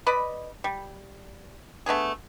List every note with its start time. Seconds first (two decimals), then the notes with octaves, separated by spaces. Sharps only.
0.06 B4 D5 D#5 B5
0.64 G3
1.86 A3 B3 D4 G#4